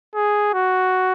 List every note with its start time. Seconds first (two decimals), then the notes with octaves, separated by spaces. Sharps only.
0.15 G#4
0.54 F#4